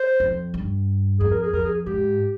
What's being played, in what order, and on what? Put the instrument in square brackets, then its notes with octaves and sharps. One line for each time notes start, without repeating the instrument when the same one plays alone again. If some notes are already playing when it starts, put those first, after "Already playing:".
Already playing: [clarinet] C5
[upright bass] F2
G2
[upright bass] F2 [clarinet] G#4
[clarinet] A#4
G#4
[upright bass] F2 [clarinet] A#4
[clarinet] G#4
[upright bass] G#2 [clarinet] G4